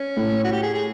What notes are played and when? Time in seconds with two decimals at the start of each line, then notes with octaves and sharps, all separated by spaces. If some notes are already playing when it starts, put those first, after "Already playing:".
Already playing: C#4
0.17 A2
0.44 F#4
0.52 G4
0.63 G#4
0.74 G#4